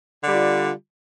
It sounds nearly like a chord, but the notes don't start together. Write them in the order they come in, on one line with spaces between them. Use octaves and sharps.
D3 G3 F4